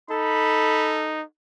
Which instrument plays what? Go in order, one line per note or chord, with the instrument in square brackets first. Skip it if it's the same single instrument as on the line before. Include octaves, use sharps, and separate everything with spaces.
[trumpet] D#4 [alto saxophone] A4 [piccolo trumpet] B5